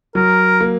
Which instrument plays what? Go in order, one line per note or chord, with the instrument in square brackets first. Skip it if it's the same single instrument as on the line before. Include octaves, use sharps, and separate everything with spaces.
[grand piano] F#3 [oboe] A#4
[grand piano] A#3